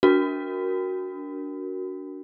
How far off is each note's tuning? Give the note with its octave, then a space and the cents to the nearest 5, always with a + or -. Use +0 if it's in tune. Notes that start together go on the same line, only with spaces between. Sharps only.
D4 -20 F#4 +0 A#4 +0